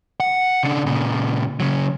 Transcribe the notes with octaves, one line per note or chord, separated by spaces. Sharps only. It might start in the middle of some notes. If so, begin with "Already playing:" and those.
F#5
C#3 D4
A#2 C#3
C#3 F#3